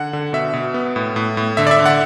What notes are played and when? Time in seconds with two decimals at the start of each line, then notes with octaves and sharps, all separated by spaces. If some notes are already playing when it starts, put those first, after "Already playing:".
Already playing: D3 F#5
0.13 D3
0.33 B2 E5
0.54 B2
0.74 B3
0.96 A2
1.16 A2
1.37 A2
1.57 D3 E5
1.67 D5
1.71 E5
1.79 D3
1.86 F#5